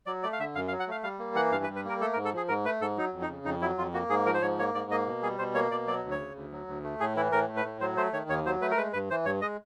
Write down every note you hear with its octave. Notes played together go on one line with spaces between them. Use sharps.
F#3 D5
A3 D5
F5
D3 E5
F#2 F5
F5
F#3
F#5
A3 F5
G3 F5
A#3
E3 F#5
G2 F5
B4
G3
B4
A#3 A#4
A3 A4
A#4
G#2
A4
F3 G#4
G#2 A#4
A3 B4
G#2 A4
F#3 D#4
F2
D#4
C#3
F2 D#4
F#3 E4
F2 F4
A#3 F#4
G#2 G#4
F3 A#4
C5
G#2 C#5
A#3 C#5
G#2 D5
A#3 D#5
B2
G3 G#4
B2 C5
A#3 C#5
B2 D5
F#3 D5
D2
C#5
C#3
D2
F#3
D2
A3
A2 G#4
E3 E4
A2 A#4
A3
B4
A2
F#3 C5
A3 C5
D#3 C#5
D#2 C#5
F#3 C5
A3 B4
A#4
G#3 B4
G2 B4
E3 C5
G2 C#5
G#3 D#5